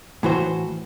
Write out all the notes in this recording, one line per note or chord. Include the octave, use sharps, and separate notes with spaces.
A2 E3 F#4 C5